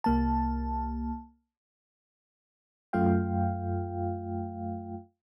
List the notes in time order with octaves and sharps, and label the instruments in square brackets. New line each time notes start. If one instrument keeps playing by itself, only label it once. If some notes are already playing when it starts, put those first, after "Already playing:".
[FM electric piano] C2 A#3 A5
F#2 A3 F4 F5 G5